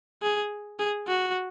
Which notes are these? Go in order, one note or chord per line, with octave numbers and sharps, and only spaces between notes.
G#4
G#4
F#4